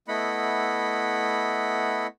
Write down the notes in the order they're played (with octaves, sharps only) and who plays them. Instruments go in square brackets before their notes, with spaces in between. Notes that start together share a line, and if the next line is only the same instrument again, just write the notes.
[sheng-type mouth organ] A3 B3 E4 D#5 F#5 B5